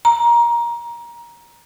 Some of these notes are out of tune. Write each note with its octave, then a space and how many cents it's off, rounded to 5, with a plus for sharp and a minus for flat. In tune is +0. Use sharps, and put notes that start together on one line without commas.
A#5 +20